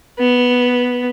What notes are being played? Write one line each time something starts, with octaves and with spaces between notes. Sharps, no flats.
B3